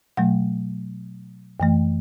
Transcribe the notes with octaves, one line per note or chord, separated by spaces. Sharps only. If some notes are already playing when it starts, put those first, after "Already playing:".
B2 F#3 A3 F#5
F#2 E3 A3